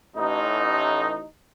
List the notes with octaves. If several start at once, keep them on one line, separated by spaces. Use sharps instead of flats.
A1 D#4